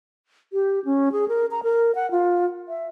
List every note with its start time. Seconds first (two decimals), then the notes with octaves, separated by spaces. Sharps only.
0.53 G4
0.85 C#4
1.12 G#4
1.28 A#4
1.51 A#5
1.63 A#4
1.95 F#5
2.11 F4
2.68 E5